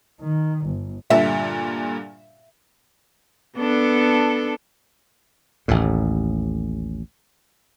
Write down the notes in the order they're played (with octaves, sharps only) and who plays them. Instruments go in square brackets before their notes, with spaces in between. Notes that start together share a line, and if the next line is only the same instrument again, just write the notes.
[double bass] D#3
G1
[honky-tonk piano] G2 A#2 D3 [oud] E5
[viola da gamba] B3 D4 A4
[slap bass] A1 D#2 A2